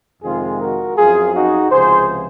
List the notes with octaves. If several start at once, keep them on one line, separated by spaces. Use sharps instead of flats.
F2 C3 D#3 G#3 C4 F4 G#4
F#4 A#4
F#2 F3 C4 F4 G#4
D#4 F#4
C#2 C3 F3 G#4 C5